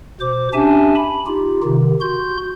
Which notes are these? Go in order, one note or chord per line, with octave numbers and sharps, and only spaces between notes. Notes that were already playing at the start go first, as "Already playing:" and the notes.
B2 C5 D6
C#4 D4 G4 E5 G#5 A5
B5
D#4 F4 G4
C3 D#3
F#4 C6 G6